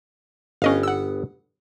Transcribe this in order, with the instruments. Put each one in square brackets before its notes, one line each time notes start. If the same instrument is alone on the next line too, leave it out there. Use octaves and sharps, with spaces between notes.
[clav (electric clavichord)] G1 B3 G5 [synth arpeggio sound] C#4 D#5 F5
[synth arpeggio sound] F#5 E6